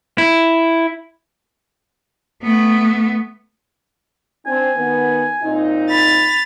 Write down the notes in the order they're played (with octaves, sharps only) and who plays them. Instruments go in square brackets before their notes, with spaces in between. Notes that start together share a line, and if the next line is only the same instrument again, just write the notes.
[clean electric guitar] E4
[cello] A3 B3
[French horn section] C4 D4 [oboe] G#5
[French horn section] D#3 B3
A#2 C4 D#4
[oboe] B5 [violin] A6 F7